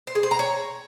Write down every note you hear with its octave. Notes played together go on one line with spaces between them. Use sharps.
C5
G#4
C5
A#5
C#5